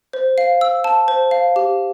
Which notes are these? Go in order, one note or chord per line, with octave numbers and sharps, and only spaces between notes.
C5
F5
E6
A5
C5
F5
G4